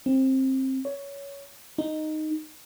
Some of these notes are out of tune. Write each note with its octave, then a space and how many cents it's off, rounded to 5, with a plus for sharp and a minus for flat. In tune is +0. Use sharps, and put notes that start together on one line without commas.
C4 +20
C#5 +15
D#4 -5